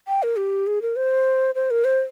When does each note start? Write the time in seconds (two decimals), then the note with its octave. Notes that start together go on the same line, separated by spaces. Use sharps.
0.08 G5
0.23 A#4
0.38 G4
0.67 G#4
0.82 A#4
0.96 C5
1.55 C5
1.71 A#4
1.85 C5